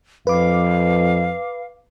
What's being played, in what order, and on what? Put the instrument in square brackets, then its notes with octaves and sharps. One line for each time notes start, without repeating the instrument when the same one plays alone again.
[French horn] F2 [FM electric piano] B4 D6 [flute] F5